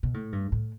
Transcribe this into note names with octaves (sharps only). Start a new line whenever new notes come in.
B2
A2
G2
A2